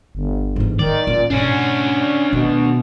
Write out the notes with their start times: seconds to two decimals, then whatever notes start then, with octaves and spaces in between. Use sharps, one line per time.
0.15 G1
0.56 G#2 E3
0.79 D#3 G#3 D5
1.07 A#2 C#4
1.30 G#2 B2 C#4 D4 F#4
2.33 B2 D#3